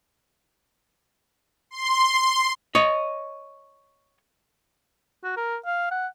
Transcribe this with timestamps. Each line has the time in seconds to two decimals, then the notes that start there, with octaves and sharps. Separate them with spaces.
1.71 C6
2.75 C#5 D#5
5.24 F#4
5.37 A#4
5.66 F5
5.91 F#5